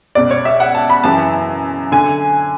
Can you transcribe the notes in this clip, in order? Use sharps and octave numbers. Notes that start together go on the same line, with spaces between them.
C#2 B2 D5
C#5
E5
F#5
A5
B5
F#2 C#3 E3 A5
D3 G#5